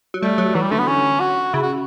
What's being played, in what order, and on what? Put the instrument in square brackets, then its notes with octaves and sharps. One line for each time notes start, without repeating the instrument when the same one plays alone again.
[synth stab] F#3
[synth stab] G3 [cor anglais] A3
[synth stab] F#3
[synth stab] E3 [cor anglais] F#3
[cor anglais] G3
[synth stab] D3 [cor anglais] A3
[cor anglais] B3
C#4
F#4
[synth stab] C#3 [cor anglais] E4
[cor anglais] F#4